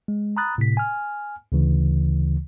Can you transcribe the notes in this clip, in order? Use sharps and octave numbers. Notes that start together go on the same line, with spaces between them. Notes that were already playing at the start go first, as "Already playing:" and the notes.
G#3
A#5 B5 D#6 F#6 A6
A2 C3 B6
G#5 F6
D2 C#3 E3